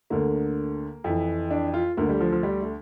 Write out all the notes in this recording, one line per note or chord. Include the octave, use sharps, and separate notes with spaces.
D2 D3 A#3
F2 E3
D4
F4
D2 D3 A#3
G3
F3
F3
G3
A3